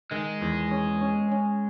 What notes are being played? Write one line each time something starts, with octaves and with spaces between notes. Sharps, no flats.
D#3 G#3
E2
C#4
C#4
C#4